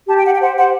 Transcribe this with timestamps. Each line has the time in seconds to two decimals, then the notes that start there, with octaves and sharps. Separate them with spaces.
0.08 G4 A5
0.16 G5
0.25 G4 F#5
0.32 G5
0.40 C5 F#5
0.57 C5 F#5